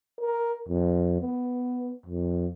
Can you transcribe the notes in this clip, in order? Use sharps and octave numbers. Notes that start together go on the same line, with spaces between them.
A#4
F2
B3
F2